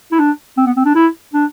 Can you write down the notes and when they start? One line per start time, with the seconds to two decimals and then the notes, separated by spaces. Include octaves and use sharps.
0.12 E4
0.19 D4
0.57 C4
0.66 B3
0.76 C4
0.85 D4
0.95 E4
1.34 D4